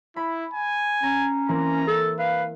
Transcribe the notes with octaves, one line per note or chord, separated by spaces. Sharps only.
E4 B5
G#5
C#4 A#5
E3 A#3 C4 A#5
A4
B4 F5